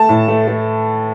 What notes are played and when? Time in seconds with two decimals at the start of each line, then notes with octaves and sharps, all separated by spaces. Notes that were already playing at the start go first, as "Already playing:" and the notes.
Already playing: A3 A5
0.09 A2
0.28 A3
0.48 A3